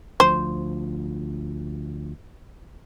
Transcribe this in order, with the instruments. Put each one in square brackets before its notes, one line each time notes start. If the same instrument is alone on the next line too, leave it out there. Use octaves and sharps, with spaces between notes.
[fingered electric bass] D2 F3 [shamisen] C5